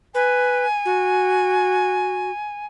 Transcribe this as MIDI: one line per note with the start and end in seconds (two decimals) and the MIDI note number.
0.15 0.66 71
0.15 2.66 80
0.85 2.31 66